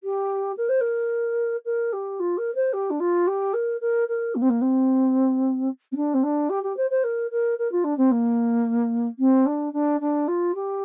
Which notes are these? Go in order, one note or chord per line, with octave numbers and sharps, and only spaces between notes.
G4
A#4
C5
A#4
A#4
G4
F4
A#4
C5
G4
D4
F4
G4
A#4
A#4
A#4
A#3
C4
A#3
C4
C4
D4
C4
D4
G4
G4
C5
C5
A#4
A#4
A#4
F4
D4
C4
A#3
C4
D4
D4
D4
F4
G4